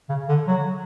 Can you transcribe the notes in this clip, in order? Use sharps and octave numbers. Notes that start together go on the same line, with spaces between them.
C#3
D3
F#3